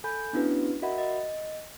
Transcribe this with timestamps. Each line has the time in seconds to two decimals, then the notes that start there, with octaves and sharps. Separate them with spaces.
0.04 A4 G#5 B5 G6
0.33 B3 C#4 D4 E4 F#4 B4
0.82 F#4 A#4 D#5 E5 F#5 B5
0.98 D#5